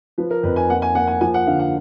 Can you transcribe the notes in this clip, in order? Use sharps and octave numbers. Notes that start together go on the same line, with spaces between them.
F3 B4
A#4
F2 B4
G#5
A#3 F#5
G#5
A#3 F#5
G#5
F3 G#5
F#5
D3 F5
F#5